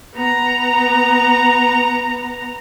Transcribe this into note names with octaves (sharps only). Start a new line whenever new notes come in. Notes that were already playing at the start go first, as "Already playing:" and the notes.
B3 A#5